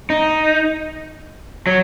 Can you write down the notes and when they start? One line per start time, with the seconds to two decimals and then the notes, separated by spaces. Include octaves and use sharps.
0.10 D#4
1.67 F#3